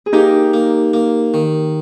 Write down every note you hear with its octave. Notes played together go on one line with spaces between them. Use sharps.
G#4
A#3 D#4 G4
A#3
A#3
D#3